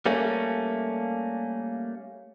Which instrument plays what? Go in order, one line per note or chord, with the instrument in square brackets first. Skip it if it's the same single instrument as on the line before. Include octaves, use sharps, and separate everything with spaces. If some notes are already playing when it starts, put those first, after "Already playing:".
[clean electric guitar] G3 A3 A#3 C#4